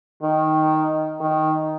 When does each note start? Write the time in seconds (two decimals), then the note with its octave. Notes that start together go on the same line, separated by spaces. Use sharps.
0.22 D#3
1.21 D#3